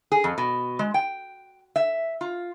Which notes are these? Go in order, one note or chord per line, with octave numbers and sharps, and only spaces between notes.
G#4
F2
B2
G#3
G5
E5
F4